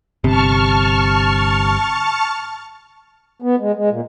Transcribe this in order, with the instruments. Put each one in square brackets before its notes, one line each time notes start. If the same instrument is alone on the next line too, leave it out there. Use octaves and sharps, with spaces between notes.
[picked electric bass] G1 C3 [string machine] A5 C#6 F6
[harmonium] B3
G#3
G#3
A#2